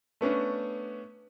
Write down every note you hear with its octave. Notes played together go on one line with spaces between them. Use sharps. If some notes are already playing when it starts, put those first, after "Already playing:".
A3 B3 C#4 D4